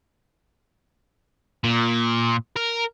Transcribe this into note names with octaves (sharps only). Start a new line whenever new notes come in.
A#2
A#4